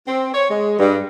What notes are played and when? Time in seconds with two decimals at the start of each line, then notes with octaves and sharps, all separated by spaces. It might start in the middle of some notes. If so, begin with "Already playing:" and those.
0.08 C4
0.34 C#5
0.50 G#3
0.79 G2